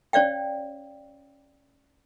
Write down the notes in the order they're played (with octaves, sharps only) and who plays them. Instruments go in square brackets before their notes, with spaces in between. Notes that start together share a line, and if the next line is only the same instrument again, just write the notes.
[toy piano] C#4 C#5 D5 F5 G5